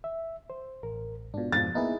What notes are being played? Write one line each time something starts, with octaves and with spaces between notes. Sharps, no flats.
E5
C5
A1 A#4
G#2 B2 D4 F4
F2 G#2 F3 A6
A#3 B3 D#4 E4 G#4